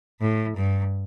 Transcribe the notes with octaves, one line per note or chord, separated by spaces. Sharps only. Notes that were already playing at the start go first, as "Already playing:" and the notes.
A2
G2